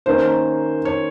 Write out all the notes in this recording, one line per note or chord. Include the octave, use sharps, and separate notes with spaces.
D#3 A#3 C#4 C5
C#5